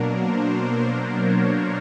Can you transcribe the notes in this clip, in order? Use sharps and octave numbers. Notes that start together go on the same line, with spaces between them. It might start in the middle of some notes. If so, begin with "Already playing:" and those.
Already playing: B2 F#3 A#3 D4 A#4
C5
C#5